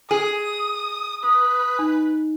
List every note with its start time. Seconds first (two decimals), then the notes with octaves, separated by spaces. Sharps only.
0.11 G#4 D#6
1.23 B4 D#6
1.79 D#4